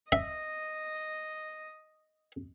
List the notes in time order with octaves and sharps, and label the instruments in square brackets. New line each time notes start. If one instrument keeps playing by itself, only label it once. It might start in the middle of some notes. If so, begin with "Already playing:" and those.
[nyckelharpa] D#5 [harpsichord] E5